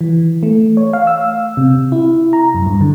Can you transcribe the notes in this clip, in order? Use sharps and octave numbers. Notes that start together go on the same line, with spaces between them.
E3
A3
C#5
F5
E6
C3
E4
A#5
F#2
G2
D3